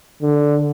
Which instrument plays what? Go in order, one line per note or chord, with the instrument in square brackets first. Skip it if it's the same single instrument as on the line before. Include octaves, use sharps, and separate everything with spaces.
[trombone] D3